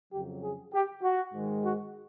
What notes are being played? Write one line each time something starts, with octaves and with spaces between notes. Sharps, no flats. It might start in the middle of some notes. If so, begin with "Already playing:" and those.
F2 C#3 F#3 G4
G#4
G4
F#4
G#2 D#3 G#3
F#4